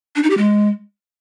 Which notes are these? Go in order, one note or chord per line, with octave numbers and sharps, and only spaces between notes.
D4
D#4
G4
G#3